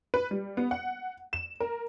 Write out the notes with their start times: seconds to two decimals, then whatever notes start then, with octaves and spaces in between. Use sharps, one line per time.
0.14 B4
0.31 G3
0.57 B3
0.71 F#5
1.33 E7
1.60 A#4